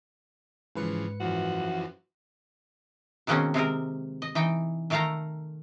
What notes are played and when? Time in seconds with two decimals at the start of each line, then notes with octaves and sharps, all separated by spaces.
0.75 G#2 C#3 E3 F3 B4 C#7
1.20 F#2 E3 F3 F#4
3.27 B2 D#3 G#3 A#3 C4 C#4
3.54 C3 G#3 C4 A#4
4.22 D#5
4.35 E3 D#4 G5
4.90 D#3 A3 A4 F5 G5 A#5